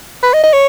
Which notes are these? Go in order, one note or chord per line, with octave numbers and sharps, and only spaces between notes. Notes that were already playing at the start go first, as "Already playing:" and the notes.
B4
D#5
D#5
C#5